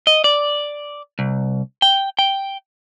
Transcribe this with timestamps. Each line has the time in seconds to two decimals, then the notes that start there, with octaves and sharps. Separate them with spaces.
0.07 D#5
0.24 D5
1.19 C2
1.82 G5
2.19 G5